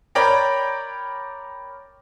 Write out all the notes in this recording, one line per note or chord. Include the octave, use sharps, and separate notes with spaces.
A#4 C#5 D5 G5 A#5 B5